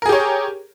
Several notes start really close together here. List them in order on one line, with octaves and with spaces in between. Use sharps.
A#4 G#4 G4 C#5